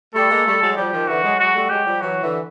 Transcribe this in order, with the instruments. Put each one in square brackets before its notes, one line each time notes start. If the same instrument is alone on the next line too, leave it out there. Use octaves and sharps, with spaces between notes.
[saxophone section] G3 A3 [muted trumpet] A4
[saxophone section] G#3 A#3
G3 A3
F#3 G#3
[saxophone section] F3 G3 [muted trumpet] G4
[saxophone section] D#3 F3
[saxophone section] D3 E3 [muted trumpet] F#4
[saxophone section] F#3 G#3
[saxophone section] F#3 G#3 [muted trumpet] F#4
[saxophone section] G3 A3
[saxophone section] F#3 G#3 [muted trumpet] G4
[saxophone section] F3 G3
[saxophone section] E3 F#3 [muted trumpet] F#4
[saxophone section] D3 E3